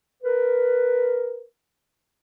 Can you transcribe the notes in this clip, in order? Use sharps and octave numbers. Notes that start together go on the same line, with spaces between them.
A#4 B4